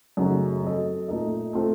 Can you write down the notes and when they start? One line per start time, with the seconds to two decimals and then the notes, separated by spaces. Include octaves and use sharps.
0.17 F#2 C#3 A3 D#4 F#4
0.63 F#3 C4 F#4 A4 D#5
1.08 A#2 A3 D#4 A#4 D#5
1.53 A3 C4 F4 A4